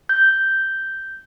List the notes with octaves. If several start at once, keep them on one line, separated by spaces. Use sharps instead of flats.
G6